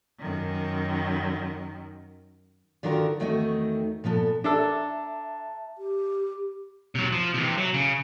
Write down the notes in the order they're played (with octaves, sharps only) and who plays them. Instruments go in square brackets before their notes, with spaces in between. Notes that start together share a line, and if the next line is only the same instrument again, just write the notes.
[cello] F#2 D#3
[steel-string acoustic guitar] D3 D#3 D4 F4 F#4 A#4
E2 D#3 A3 C4 F#4 D#5
A#2 F3 B3 A4
[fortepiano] D4 A4 [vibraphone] E5 A5 A#5
[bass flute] G4
[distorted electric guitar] C3 F#3
F3
C3 E3
F#3
C#3